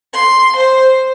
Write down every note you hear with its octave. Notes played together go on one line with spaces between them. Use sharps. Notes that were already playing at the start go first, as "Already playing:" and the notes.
C6
C5